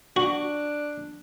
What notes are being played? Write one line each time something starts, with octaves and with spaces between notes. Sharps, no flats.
D4 F#4